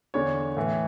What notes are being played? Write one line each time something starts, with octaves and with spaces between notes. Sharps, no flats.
E2 D3 C#5
A2 E3